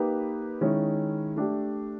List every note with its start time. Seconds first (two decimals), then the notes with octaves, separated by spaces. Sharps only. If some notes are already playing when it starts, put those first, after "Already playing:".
Already playing: A#3 D#4 G4 B4
0.61 D#3 G#3 C#4 E4
1.36 A3 D4 G4